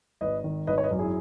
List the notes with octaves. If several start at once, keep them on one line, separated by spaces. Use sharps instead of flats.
G#1 B4 D#5
D#3
G#1 B4 D#5
C#5
B4 D#5
F#2
E4 G#4